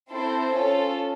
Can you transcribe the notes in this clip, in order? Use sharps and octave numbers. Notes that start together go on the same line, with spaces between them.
C4 E4 A4 C5
C#4 F4 A4